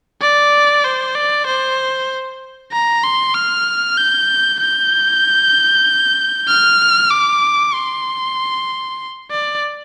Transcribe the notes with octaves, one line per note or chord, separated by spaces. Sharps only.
D5
C5
D5
C5
A#5
C6
F6
G6
G6
F6
D6
C6
D5